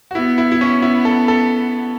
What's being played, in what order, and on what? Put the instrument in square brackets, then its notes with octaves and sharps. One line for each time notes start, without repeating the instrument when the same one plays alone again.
[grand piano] F#4
[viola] B3 [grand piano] E4
[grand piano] E4
E4
C#4
E4
A4
A4